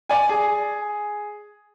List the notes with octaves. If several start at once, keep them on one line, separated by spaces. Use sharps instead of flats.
D5 G#5
G#4